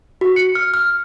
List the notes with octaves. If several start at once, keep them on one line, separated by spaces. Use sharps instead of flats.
F#4
C#7
F6
F6